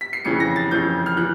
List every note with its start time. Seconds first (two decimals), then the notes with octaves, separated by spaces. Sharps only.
0.01 B6
0.13 C7
0.25 F2 C#3 E3 C#7
0.40 A#6
0.56 A6
0.71 F2 C#3 E3 G6
1.06 F6
1.17 E3 F#6